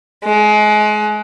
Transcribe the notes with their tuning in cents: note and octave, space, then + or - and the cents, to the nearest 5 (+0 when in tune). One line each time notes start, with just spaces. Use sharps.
G#3 +30